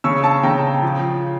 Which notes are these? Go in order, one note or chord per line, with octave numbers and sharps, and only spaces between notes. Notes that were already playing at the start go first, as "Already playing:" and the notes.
C#3 C#6 E6
A5 C#6
C#3 G5 A#5
F3